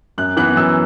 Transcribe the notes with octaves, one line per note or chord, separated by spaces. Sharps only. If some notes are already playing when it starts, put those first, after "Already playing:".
F#2 F#6
E3 B3 F#6
F#2 E6